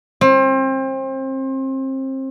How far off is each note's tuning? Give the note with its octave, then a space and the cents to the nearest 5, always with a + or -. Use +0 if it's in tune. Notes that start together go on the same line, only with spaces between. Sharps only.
C4 +30